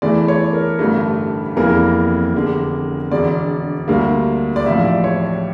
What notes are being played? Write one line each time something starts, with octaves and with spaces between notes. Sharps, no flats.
E2 E3 A3 D5
C#5
A#4
A1 G2 D3 A3
F1 E2 E3 A#3 A#4
F1 E2 D3
E1 E2 D3 D5
D2 D3 G3 A#3
D5
A1 A2 F3 E5
D5
C#5